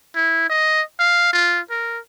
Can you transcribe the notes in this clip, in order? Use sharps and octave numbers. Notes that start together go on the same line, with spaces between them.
E4
D#5
F5
F4
A#4